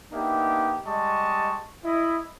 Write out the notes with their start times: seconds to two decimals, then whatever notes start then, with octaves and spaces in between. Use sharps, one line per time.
0.12 A#3 B3 D4 D#4 G4 E5
0.86 G3 G#3 D#5 A5 C#6
1.85 E4 D#5